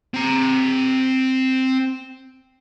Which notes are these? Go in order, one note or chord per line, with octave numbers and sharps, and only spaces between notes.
C4 A#5